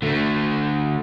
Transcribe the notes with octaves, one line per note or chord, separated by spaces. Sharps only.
D3 A3